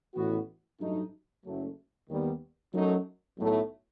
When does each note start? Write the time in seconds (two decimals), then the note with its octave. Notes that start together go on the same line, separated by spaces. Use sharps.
0.15 A1 A2 E3 B3 F#4
0.80 A1 G2 F#3 A3 D#4
1.44 F#1 F#2 F#3 A3
2.09 D#2 D#3 G3 B3
2.73 F#2 F#3 A3 D#4
3.37 B1 A2 F#3 A3